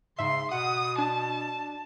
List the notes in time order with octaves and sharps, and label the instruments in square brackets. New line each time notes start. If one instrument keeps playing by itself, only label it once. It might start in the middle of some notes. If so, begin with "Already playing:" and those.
[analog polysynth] G#2 E5 [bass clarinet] C#3 [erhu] C6
[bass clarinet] B2 [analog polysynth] F#5 [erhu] D#6
[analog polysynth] D4 [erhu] A5